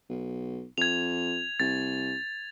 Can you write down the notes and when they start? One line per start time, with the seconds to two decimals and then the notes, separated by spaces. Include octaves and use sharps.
0.09 B1
0.78 F2 G#6 F7
1.60 C2 A6